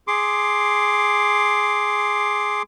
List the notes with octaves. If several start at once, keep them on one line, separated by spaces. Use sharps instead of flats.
G#4 C6 D6